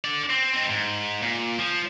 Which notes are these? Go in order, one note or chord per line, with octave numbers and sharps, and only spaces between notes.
D3 D5
C4
C4 D#4
G#2
A#2
F3